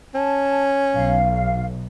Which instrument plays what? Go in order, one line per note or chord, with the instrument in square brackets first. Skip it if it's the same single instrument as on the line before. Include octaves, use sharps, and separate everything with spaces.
[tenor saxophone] C#4 [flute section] A5
[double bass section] B1 [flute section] F5